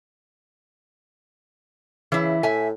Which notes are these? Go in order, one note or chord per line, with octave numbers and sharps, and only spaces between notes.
C#3 E3 E4
A2 E5 G#5